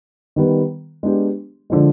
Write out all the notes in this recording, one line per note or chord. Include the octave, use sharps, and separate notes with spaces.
D#3 G3 B3
G#3 B3 D4 G4
D3 F3 G#3